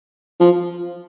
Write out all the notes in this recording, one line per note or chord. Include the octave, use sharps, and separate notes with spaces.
F3